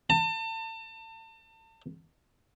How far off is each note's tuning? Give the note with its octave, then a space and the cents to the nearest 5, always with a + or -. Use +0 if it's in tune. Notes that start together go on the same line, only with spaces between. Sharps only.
A5 +35